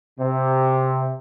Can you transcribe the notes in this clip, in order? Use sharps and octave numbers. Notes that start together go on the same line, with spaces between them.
C3